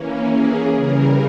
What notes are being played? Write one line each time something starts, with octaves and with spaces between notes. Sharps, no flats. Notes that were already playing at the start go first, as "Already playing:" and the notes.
Already playing: E3 A#3 C#4
G#4
C#3 E3 G3 A#4